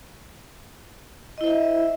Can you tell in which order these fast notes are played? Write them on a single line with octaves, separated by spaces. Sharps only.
D#5 E4 C5 E5